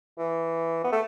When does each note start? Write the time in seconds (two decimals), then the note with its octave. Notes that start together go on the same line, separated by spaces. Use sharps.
0.18 E3
0.84 B3
0.92 A3